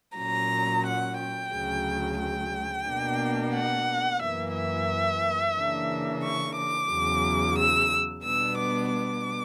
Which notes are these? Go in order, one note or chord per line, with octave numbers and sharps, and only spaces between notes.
A#2 F#3 C#4 A#5
F#5
G5
D2 C#3 F#3
G5
B2 A#3 D4
F#5
F#2 E3 A#3 E5
E5
C#3 E3 A#3 D4
C#6
D6
E2 C#3 F#3
E6
B2 G3 B3 D4 E6
D6
D6